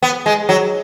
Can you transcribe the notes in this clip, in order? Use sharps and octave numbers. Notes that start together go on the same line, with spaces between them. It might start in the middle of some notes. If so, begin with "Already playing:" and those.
B3
G#3
F#3